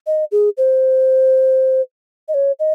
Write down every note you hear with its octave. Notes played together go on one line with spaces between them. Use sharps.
D#5
G#4
C5
D#5
C#5
D#5